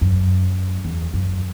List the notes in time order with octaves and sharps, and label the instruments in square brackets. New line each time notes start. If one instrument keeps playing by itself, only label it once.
[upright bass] F#2
E2
F#2